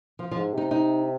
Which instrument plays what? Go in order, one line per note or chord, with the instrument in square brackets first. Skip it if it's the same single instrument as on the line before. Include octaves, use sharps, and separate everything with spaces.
[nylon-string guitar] F3
F3
[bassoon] G#2
[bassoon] C3 [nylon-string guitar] D#4
[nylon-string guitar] D#4